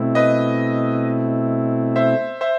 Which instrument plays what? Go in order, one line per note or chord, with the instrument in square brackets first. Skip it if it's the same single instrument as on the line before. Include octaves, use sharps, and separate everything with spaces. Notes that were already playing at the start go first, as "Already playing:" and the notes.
Already playing: [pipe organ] B2 A3 C4 E4
[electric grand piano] B4 D#5
C5 E5
C5 E5